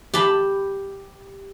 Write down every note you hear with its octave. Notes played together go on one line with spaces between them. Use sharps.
G4 A5 B5